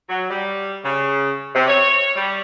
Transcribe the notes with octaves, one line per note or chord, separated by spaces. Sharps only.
F#3
G3
C#3
C3
C#5
G3